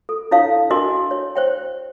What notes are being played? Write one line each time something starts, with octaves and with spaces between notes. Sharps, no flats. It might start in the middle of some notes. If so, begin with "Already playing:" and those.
A4
D4 E4 A4 C#5 F5 A5
D4 F#4 A#4 D#5 G#5 C6
C#5
C5 C#5 G5